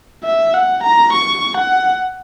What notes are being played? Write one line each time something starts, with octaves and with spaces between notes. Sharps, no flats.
E5
F#5
A#5
C#6
F#5